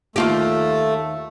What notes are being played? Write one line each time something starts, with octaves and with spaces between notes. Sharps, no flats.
D#2 A3 F4 G4